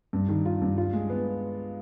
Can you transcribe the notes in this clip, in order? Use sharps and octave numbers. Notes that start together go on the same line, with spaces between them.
G2
D#3
F4
G2
F4
G#3
B3